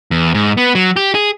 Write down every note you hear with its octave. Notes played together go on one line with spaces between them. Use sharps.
E2
G#2
B3
F#3
G4
G#4